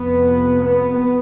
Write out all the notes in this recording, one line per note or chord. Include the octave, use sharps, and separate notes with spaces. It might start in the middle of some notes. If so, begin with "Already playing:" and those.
Already playing: F2 C3 B3
B3